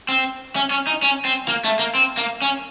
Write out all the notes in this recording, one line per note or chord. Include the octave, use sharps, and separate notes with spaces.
C4
C#4
C#4
D#4
C#4
C4
A#3
A3
A#3
C4
A#3
C#4